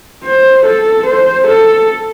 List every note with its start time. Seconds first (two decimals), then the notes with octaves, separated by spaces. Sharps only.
0.24 C5
0.65 A4
1.06 C5
1.47 A4